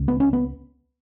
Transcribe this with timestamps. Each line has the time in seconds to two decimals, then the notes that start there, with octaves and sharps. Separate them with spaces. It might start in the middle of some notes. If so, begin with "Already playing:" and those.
Already playing: C#2 C#3
0.08 B3
0.20 C#4
0.33 B3